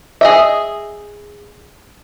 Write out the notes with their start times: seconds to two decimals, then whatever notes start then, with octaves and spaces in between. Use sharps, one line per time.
0.21 G#4 D#5 E5